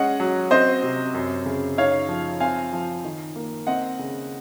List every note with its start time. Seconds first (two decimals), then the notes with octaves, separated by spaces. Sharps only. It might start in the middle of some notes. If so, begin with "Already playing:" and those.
Already playing: G#3 C#4 D#5 F#5
0.20 F#3
0.51 C4 C5 D#5
0.83 C3
1.14 F#2
1.46 C#3
1.78 D#4 C#5 F5
2.09 F3
2.40 C4 F5 G#5
2.73 F3
3.04 D#3
3.36 A#3
3.67 C4 D#5 F#5
3.99 C#3